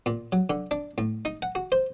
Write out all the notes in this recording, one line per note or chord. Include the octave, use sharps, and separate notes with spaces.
A#2
F#3
D3
D4
A2
D#4
F#5
F#4
C5